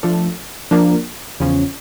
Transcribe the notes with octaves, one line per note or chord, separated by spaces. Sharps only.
F3 A3 D4 F4 A4
F3 A#3 D4
E2 C#3 F3 C#4